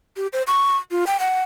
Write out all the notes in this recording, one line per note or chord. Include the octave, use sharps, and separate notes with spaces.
G4
C5
C#6
F4
G5
F#5